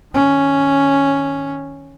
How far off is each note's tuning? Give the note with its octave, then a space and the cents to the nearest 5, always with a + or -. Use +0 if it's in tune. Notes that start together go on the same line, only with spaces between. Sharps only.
D#3 +10 C#4 +0